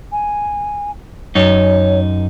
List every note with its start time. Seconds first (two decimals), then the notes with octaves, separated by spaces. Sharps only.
0.12 G#5
1.35 F#2 D#4 C#5